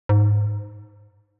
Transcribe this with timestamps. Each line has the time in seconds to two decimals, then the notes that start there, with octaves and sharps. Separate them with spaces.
0.09 G#2